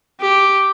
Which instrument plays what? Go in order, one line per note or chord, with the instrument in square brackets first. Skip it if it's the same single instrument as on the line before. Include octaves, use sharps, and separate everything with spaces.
[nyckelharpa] G4